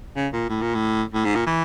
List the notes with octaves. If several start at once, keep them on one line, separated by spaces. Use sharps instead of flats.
C#3
A#2
A2
A#2
A2
A2
G#2
A#2
E3